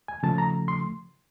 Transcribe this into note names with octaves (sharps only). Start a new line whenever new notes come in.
G#5
C#3 F3 A3 A5
A#5
C6